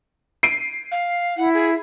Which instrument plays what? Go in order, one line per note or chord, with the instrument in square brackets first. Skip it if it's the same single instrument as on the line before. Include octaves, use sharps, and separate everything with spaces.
[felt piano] C7 D7 D#7
[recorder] F5
[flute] E4 [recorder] F#5
[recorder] G#4